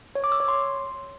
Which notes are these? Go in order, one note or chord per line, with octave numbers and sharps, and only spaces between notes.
C#5
D6
E6
C#5
C6